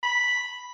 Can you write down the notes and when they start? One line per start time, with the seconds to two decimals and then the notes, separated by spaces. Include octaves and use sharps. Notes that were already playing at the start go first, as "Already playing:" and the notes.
0.03 B5